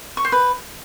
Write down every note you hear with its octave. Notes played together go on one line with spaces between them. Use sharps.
C#6
C5
B4